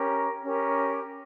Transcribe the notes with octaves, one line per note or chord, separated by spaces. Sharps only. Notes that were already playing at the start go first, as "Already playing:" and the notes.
Already playing: C#4 G4 A#4
C#4 G4 A#4